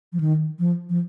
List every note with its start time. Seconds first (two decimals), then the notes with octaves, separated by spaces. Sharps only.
0.13 F3
0.20 D#3
0.59 F3
0.89 F3